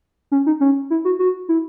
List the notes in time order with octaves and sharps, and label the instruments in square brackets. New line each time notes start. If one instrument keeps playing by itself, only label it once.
[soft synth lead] C#4
D#4
C#4
E4
F#4
F#4
E4